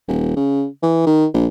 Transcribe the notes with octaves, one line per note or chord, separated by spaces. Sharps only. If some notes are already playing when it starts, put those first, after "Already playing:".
D#1
C#3
E3
D#3
A#1